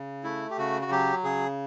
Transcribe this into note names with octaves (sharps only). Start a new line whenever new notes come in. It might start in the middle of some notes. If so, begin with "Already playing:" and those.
Already playing: C#3
A3 E4
G4
C#3 F#4
F#4
F#3 G4
C#3 G#4